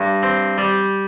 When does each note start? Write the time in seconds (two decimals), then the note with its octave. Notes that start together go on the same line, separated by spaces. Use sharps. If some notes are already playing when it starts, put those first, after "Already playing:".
Already playing: G2
0.23 C4
0.58 G3